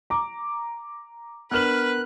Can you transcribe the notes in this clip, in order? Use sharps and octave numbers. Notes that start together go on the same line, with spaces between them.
A#5 D6
B3 D4 A#4 B4 F6 F#6 F#7